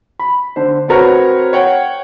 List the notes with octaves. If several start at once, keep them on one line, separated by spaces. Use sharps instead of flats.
B5
D3 C5
C4 F#4 A#4 B4 C#5
C#5 F#5 G5